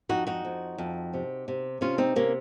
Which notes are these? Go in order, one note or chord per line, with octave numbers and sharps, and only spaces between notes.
F2 D#4 F#4
D#4 F#4
F2
F2
C3
C3
C3 C#4 F4
C4 D#4
C3 A#3 C#4